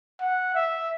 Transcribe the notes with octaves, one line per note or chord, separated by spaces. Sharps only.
F#5
E5